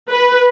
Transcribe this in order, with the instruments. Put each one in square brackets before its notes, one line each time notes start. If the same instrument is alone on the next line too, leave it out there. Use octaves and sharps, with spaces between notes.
[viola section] B4